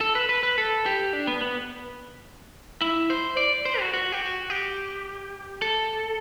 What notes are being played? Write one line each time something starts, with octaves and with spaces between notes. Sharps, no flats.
A4
B4
B4
B4
A4
G4
D4
B3
B3
E4
C5
D5
C5
F#4
F#4
G4
F#4
G4
A4